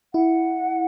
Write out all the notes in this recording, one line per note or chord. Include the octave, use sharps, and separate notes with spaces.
E4 F#5